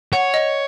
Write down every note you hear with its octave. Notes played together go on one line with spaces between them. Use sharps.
C#5 F#5
D#5